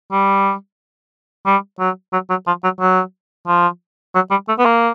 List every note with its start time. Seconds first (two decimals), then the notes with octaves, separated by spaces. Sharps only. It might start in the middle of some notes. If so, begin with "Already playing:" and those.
0.12 G3
1.46 G3
1.79 F#3
2.13 F#3
2.30 F#3
2.47 F3
2.64 F#3
2.80 F#3
3.47 F3
4.15 F#3
4.31 G3
4.48 A3
4.59 B3
4.65 A#3